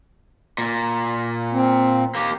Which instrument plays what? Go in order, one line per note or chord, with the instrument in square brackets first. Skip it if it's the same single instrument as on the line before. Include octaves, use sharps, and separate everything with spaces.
[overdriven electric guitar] A#2
[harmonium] C4
[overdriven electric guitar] A#3 G4